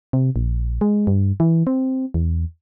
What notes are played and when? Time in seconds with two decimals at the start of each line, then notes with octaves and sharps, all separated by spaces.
0.13 C3
0.36 A#1
0.81 G#3
1.07 G2
1.40 E3
1.67 C4
2.14 E2